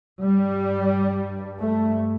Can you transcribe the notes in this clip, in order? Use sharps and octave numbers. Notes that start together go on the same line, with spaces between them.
G2 G3
A3